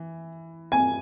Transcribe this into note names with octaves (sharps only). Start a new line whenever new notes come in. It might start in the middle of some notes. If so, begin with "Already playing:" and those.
Already playing: E3
G#5